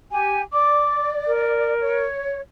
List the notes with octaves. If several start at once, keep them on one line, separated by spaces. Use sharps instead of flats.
G4 G#5
D5 D6
A#4
C#5